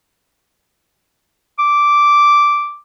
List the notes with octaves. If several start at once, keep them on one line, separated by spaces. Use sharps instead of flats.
D6